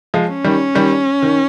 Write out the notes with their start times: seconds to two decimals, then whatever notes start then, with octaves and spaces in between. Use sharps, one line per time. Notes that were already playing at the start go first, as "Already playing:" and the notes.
0.14 F3 G#3
0.29 C#4
0.44 D#3 G3
0.75 D#3 G3
1.22 D#3